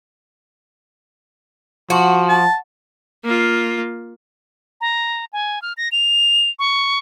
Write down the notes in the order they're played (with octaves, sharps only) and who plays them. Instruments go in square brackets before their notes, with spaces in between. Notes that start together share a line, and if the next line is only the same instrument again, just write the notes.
[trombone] F3 [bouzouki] F#4
[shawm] A5
[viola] A#3 F4
[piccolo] A#5
G#5
F6
A#6
F7
C#6